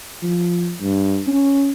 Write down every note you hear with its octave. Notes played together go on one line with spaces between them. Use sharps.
F3
G2
C#4